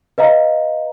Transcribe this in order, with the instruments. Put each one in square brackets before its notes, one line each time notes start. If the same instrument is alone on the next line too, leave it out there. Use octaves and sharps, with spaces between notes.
[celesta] B4 D#5 F5 A#5